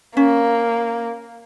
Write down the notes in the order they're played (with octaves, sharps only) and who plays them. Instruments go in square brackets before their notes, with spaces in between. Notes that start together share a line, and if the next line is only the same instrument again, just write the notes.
[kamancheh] A#3 [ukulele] C#4